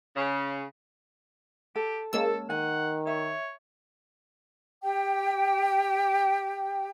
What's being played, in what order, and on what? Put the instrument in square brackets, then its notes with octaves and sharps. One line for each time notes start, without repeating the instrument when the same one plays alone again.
[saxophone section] C#3
[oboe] G4 [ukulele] A4
[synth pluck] G#3 A#3 E6 [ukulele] C#4 A5 [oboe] A4
[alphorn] D#3 [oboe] F#5 [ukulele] G#5
[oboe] C#5 [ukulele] E5
[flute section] G4 G5